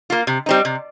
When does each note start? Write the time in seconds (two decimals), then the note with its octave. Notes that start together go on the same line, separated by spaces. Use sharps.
0.10 A#3 F4
0.27 C3
0.46 G3 C4 D#4
0.65 C3